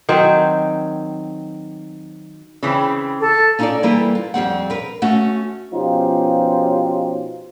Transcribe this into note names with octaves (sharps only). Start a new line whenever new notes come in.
D#3 F#3 C4
C#3 E3 C4
A4
C#4 D#4 F4 G#4 A4 D5
E3 G3 A#3 E4 A4 B4
F4
F2 G3 C4 F#5
A#4 B4
A3 C#4 F#4 F#5
B2 F3 C#4 D#4 F4 G4